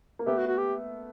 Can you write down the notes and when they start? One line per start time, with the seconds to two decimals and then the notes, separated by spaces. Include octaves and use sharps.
0.19 A#3
0.26 A3 B3 G4
0.37 F#4
0.48 F#4
0.58 G4